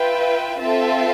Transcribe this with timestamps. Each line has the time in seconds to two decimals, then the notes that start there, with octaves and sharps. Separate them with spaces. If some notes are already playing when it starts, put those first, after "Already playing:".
Already playing: F4 B4 E5 G5
0.60 C4 F4 A4 E5